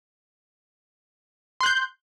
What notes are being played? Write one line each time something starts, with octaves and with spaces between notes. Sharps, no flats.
C6 F#6 G6